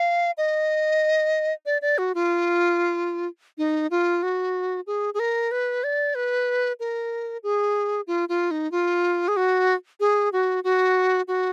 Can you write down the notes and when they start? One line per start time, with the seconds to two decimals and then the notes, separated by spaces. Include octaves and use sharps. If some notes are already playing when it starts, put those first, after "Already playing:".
Already playing: F5
0.38 D#5
1.66 D5
1.82 D5
1.98 F#4
2.15 F4
3.58 D#4
3.91 F4
4.23 F#4
4.87 G#4
5.14 G#4
5.19 A#4
5.51 B4
5.84 D5
6.15 B4
6.80 A#4
7.43 G#4
8.07 F4
8.29 F4
8.51 D#4
8.72 F4
9.28 G#4
9.37 F#4
10.00 G#4
10.33 F#4
10.64 F#4
11.28 F#4